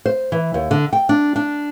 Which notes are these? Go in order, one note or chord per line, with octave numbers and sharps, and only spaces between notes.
C5
E3
D#2
D3
G5
D4
D4